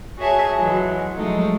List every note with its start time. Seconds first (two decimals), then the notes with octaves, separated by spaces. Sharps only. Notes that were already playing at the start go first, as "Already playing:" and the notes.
0.18 F#4 G#4 C#5 E5 G#5 A5
0.56 E3 F#3 G#3
1.16 F3 F#3 G#3 A3 D#4